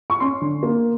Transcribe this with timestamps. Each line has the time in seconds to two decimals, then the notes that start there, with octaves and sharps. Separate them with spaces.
0.10 C#6
0.20 C#4 C6
0.41 D3
0.63 A#3